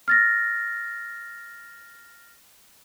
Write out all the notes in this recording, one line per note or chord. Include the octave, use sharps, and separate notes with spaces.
F6 A6 A#6